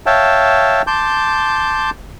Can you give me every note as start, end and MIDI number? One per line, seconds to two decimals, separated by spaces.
0.06 0.82 73
0.06 0.82 76
0.06 0.82 77
0.06 0.82 79
0.06 0.82 81
0.87 1.90 81
0.87 1.90 84
0.87 1.90 86
0.87 1.90 91